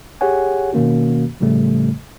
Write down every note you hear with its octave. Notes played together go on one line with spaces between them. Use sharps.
G4 G#4 C#5 F#5 G#5
B2 D#3 A#3 C#4 F#4
A2 C#3 F3 G3 A3